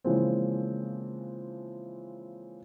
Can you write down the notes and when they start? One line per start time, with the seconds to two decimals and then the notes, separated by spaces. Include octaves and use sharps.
0.05 C#3 E3 F3 G#3 A#3 C4